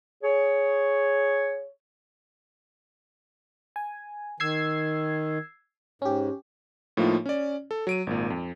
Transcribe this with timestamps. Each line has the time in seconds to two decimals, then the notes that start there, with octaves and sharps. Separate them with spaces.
0.23 G#4 C#5
3.76 G#5
4.40 D#3 E6 G#6 C7
6.02 G#2 C#4 G4
6.97 A2 F3 A#3 D#4 F4
7.26 C#4 D5
7.71 A4
7.87 F#3 D7 D#7
8.07 G#1 A#2
8.30 F2